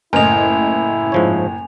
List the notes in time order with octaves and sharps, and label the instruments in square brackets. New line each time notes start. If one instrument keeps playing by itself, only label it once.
[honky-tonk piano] F#1 A2 [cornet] E4 [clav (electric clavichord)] A#4 D#5 [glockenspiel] G#5 F7
[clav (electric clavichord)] G#2 F3 C#5